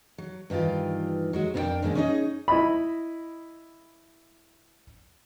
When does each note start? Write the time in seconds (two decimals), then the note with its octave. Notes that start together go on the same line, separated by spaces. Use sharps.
0.18 F#3
0.50 G2 D#3 E3 F4 G4
1.33 F#3 G#3 F#4
1.54 F2 B3 D4 F4 A#4 G5
1.82 F#2 D#3 G#3 A#3 D4
1.95 C#4 D#4 G#4 B4 D#5
2.48 E4 D#5 B5